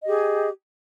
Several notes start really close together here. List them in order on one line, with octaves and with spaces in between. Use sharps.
D#5 G4 G#4